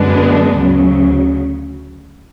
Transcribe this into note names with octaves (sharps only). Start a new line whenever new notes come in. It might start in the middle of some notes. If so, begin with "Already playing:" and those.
Already playing: F#2 D3 G#3 B3 D4
D2 C#3 F#3